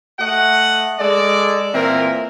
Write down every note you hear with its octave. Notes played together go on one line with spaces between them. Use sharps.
A3 D#5 F#5
G#3 A4 D5
A#2 E3 C4 A#4